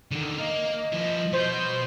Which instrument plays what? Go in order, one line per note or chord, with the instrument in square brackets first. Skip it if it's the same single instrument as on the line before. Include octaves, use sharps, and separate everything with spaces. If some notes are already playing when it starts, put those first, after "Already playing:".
[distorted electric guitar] D3 D#3
[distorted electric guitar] A#3 A#4 [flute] D#5
[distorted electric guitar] F3 E4
[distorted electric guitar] B2 B3 [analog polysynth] C5 G6